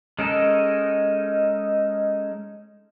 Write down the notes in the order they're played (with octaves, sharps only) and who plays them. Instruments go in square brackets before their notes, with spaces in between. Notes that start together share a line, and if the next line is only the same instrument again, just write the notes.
[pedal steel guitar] G#3 C#4 D#4 A4 A#4